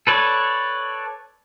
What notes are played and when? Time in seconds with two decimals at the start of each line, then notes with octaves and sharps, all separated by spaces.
0.07 A4 B4 C#5 D5